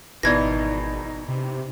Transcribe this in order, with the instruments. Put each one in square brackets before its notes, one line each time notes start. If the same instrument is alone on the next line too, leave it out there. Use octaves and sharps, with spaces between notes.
[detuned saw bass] G#1 [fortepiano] B2 E3 [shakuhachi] D#4 [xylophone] D5 G#6 A#6
[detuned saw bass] C3